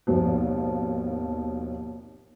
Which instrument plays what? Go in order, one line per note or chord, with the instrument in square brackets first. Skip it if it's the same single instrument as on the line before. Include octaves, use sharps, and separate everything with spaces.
[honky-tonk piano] G#1 D#2 B2 F3